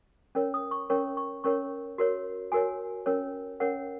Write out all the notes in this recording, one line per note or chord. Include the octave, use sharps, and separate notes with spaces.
C#4 A#4 C#5
D#6
C#6
C#4 A#4 C#5 C#6
C#6
C#4 A#4 C#5 C#6
F#4 A#4 C#5
F#4 A#4 C#5 G#5
C#4 A#4 C#5
C#4 A#4 C#5 F#5